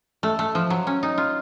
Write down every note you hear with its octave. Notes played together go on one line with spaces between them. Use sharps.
A3
A3
F3
F#3
C#4
D#4
F4